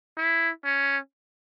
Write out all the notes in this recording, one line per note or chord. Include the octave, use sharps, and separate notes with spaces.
E4
C#4